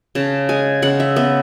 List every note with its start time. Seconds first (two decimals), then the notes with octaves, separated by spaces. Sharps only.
0.15 C#3 A5
0.49 G#3 G#5
0.82 C#3 F#5
1.00 E5
1.16 B3 E5